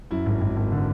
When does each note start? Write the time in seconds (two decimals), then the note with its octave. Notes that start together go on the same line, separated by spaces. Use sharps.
0.11 F#2 E4
0.26 G#1
0.41 G#1
0.56 G#1
0.72 D3